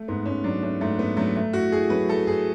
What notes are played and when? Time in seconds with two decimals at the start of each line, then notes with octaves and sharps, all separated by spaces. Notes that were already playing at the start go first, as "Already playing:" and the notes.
Already playing: A3
0.08 G#2 B3
0.26 G#2 C#4
0.44 F#3 D4
0.62 A3 C#4
0.81 G#2 A3
0.99 G#2 B3
1.17 F#3 A3
1.36 A3
1.53 A2 F#4
1.72 A2 G#4
1.90 F#3 B4
2.09 A3 A4
2.27 A2 G#4